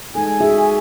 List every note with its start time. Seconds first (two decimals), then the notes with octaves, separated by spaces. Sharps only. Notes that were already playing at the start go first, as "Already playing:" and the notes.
0.15 G#3 D#4 A4 G#5
0.41 F#4 G#4 E5